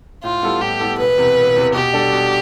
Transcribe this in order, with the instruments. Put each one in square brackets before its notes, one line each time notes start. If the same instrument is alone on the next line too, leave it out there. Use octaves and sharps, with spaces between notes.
[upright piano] A2 [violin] F4
[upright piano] G3 B3 E4 A4
[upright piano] A2 [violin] G4
[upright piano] G3 B3 E4 A4
[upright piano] E1 [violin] B4
[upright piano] E2 C3
E1
E2 C3
[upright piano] B2 [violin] G4
[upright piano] G3 D4 A4
B2